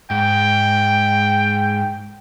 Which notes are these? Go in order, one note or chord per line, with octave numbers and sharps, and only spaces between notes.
G#2 G5